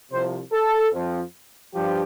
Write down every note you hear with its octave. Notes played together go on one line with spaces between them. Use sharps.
C2 C3 F3 C5
A4
F2 F3
G2 F3 G4